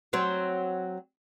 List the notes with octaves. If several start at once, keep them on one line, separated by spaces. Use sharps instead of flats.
F#3 C4